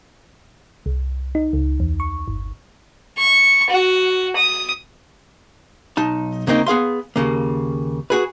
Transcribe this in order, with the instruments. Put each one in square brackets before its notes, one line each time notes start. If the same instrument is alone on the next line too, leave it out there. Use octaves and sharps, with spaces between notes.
[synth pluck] C2
D#4
C#2
E2
C#6
G1
[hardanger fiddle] C#6
F#4
D#6
[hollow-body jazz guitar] B1 D#4 A5
C#3 A#3 C4 D#4
B3 G#4 F5 C6
D#2 C#3 A#3
F#4 G#4 B4